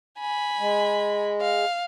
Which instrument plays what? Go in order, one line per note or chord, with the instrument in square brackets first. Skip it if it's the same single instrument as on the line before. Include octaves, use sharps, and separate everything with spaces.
[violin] G#5 B5
[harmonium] G#3
[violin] F5